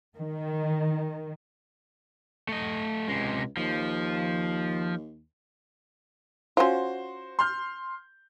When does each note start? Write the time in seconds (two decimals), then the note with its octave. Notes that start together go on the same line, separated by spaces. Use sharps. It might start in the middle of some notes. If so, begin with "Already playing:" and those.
0.18 D#3
2.49 A3 D#5
3.08 C#2 C3 G#3
3.57 D#2 F3
6.57 C#4 F4 F#4 C5
7.39 C6 F6 G6